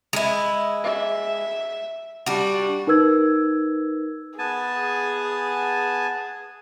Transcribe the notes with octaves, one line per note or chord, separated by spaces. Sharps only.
G#3 E4
E5
G3 D4 F#4
D#4 A#4 B4 E6 G#6
B3 G#4 G#5 A5